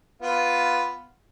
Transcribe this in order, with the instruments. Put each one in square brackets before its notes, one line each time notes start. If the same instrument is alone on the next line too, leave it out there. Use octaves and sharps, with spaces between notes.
[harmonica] B3 F4 B4